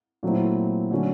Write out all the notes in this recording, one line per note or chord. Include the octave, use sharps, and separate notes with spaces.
A#2 F#3 A3 C4 E4
D3 F#3 A3 C#4 F#4